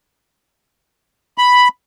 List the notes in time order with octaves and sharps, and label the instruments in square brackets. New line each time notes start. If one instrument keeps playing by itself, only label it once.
[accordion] B5